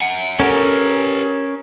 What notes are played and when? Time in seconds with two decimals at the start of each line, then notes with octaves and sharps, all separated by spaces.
0.01 F#5 G#5
0.40 C#4 G4 A4 A#4